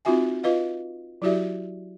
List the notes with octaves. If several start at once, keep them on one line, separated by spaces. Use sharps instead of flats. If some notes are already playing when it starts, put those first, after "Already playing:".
C4 D#4 F4 F#4 E5 G#5
F4 B4 D#5 F5
F#3 E4 F#4 G4 D5 E5